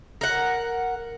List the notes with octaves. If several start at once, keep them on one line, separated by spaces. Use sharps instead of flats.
A#4 F#5